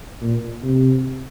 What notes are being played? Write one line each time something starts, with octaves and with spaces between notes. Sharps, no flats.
A#2
C3